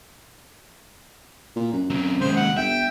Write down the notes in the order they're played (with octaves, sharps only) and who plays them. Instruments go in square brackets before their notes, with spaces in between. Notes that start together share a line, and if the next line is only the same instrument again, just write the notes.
[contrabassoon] A#2
F#2
[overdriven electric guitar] F#3 C4
[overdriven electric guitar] D#2 G#3 [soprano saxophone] C5
[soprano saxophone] F#5
[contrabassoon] G1 [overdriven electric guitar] E5 [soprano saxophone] G5